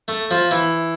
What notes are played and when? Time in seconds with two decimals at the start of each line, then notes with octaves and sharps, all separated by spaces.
0.08 A3
0.31 F3
0.51 E3